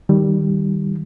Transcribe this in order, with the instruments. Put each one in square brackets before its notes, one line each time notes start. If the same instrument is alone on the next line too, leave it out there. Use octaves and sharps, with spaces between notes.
[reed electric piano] D#3 G3